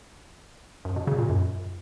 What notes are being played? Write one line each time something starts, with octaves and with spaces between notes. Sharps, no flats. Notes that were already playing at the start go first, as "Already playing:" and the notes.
F#2
B2
C#3
A#2
F#2